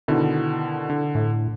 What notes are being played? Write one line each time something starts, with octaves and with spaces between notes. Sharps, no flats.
B2 D3 D#3 E4
D3
A2